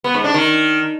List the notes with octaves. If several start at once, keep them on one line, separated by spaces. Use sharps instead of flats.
B3
G#2
D4
D#3